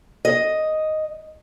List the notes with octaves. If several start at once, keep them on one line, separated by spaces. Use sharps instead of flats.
D#5